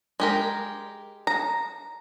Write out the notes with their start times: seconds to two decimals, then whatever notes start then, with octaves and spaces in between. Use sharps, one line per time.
0.20 G#3 G4 A#4
1.27 A#5